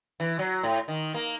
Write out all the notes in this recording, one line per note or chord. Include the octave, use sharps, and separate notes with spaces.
E3
F#3
A2
D#3
A#3